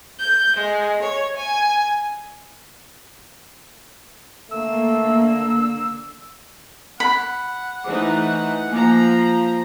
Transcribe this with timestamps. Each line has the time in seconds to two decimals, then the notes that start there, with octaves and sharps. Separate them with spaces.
0.19 G6
0.56 G#3
1.02 C#5
1.36 G#5
4.51 D3 A3 A#3 E6
7.00 F#5 B5
7.84 E3 A3 D#4 C5 D6
8.70 F3 A#3 G#5 A#5 D6